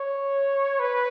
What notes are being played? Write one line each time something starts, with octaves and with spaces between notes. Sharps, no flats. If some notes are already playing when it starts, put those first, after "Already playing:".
Already playing: C#5
B4